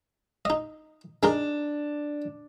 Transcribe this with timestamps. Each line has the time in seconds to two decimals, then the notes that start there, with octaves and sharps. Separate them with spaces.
0.45 D#4 D#5
1.23 G#3 D4 D#4 A#4